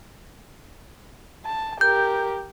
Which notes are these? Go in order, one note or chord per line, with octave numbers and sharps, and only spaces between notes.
A5
G4 A#4 G6